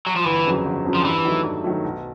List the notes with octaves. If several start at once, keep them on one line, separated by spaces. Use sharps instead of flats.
F#3
F3
G1 E3
F2 C#3 F#3
G1
F2 C#3 F#3
F3
G2 E3
D#3 F#3 A3
G2
D#3 F#3 A3
B1